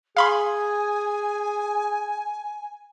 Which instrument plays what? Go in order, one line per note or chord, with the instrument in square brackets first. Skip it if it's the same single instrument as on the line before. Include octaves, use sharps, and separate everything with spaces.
[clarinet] G#4 [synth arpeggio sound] F5 B5 C6 [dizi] G#5